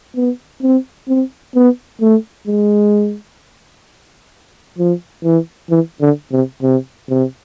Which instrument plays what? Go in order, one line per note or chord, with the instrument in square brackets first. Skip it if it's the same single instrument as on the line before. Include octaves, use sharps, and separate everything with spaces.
[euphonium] B3
C4
C4
B3
A3
G#3
F3
E3
E3
D3
C3
C3
C3